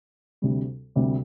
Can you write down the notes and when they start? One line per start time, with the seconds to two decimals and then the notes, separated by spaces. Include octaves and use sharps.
0.42 D2 C3 G3
0.95 D2 C3 G3